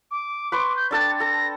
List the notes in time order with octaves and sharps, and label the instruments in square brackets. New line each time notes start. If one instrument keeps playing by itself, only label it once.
[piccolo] D6
[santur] B4 C6 C#6
[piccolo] G6
[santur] D4 A4 G5 [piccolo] A6
[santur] A4 [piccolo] A#6